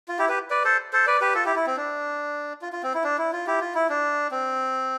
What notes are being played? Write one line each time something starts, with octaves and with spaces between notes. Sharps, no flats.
F4
E4 G4
G4 B4
B4 D5
A4 C5
A4 C5
B4 D5
G4 B4
F4 A4
E4 G4
E4
C4
D4
F4
F4
C4
E4
D4
E4
F4
E4 G4
F4
E4
D4
C4